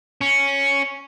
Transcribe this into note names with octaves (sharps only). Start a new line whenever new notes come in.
C#4